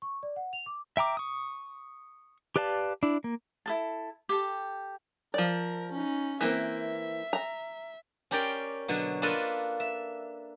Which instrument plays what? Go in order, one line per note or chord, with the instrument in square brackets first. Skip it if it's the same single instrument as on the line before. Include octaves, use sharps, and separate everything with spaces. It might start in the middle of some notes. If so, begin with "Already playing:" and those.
[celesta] C#6
D5
F#5
F7
D6
[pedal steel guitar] E5 G5 A#5 D6
C#6 D#6
G4 B4 D5 F5 A5
D4 E4
A#3
[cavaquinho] E4 A4 A5
G4 A4
[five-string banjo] F3 D5 [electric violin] A#4
[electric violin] C#4 D#4
[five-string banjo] E3 A#3 C4 [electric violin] E5
[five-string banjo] A#5
[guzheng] C#4 G4 A#4 D5 G5 C6
B2 D3 F#3
A#3 D4 F4 A4 B4 D#5
E5